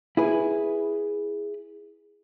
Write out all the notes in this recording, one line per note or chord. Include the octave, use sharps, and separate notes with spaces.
E4 G#4 B4